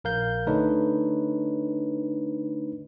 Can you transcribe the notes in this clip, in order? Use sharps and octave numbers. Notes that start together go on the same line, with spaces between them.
A#1 A#4 F5 G6
D3 A3 D4 D#4 B4 C#5